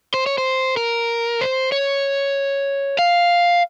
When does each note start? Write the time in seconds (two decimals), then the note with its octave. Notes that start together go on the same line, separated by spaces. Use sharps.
0.14 C5
0.26 C#5
0.38 C5
0.77 A#4
1.41 C5
1.72 C#5
2.99 F5